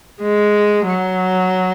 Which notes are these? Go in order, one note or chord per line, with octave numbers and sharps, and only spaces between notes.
G#3
F#3